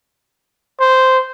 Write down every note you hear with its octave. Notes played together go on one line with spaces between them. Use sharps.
C5